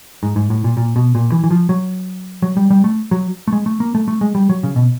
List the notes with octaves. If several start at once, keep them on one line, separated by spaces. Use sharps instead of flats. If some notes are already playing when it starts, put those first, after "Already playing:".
G#2
G#2
A2
A#2
A#2
B2
A#2
E3
E3
F3
F#3
F#3
G3
G3
A3
F#3
A3
G#3
A3
A#3
A3
A3
G#3
G3
F#3
C#3
B2